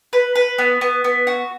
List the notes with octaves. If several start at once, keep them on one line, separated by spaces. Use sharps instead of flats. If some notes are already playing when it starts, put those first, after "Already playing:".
B4
B4
B3
B3
B3
F#4